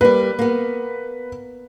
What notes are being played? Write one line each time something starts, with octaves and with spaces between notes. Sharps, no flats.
G3 A#3 B4
A#3 B3